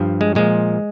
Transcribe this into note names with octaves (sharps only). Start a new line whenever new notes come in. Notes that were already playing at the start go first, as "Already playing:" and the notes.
Already playing: G2 F3
G#3
A#2 F3 G#3